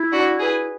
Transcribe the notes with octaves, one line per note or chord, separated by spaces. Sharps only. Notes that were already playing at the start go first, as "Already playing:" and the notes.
Already playing: E4
D4 F#4
G#4 B4